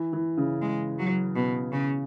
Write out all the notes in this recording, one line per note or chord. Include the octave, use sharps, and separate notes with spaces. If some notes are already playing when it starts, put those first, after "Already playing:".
Already playing: E3
E3
C#3
G#3
F#3
B2
C#3